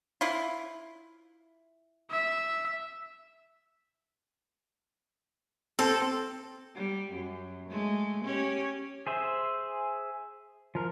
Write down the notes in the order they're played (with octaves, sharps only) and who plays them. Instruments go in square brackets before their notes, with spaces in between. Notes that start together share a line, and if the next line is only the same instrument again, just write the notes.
[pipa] E4 F4
[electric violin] E5
[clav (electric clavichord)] C4 [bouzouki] A4
[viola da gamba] G3
F#2
G#3 A3
C#4 G4 C#5
[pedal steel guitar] G#4 C5 E5
F3 A#4